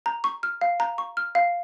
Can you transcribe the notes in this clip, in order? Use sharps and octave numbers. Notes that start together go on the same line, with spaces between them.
A#5
C#6
F6
F5
A#5
C#6
F6
F5